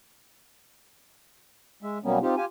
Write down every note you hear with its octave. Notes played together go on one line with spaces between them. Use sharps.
G#3 E5
B2 F#3 G3 A#3 B3 C#4
C4 D#4 F4 G4
F4 G4 G#5